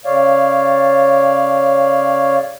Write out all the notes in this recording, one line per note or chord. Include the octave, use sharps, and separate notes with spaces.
C#3 C#5 D5 F5